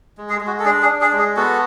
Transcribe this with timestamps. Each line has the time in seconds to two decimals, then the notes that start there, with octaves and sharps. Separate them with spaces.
0.17 G#3
0.29 G#4
0.41 G#3
0.47 F#4
0.59 A4
0.65 D4 G#4
0.82 G#4
0.89 D4
1.01 G#4
1.13 G#3
1.19 G#4
1.36 B3 F#4 A4